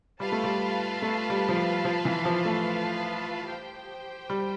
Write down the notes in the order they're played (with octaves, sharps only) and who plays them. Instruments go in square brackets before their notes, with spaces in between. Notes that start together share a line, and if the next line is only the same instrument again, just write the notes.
[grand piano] G3 [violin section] F4 B4 F5 A5
[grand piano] A3
G3
A3
G3
F3
G3
F3
E3
F3
A3
[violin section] G4 C5 G5
[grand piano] G3